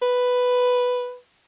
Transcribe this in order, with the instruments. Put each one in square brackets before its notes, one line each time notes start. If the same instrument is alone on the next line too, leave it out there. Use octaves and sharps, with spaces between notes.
[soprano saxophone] B4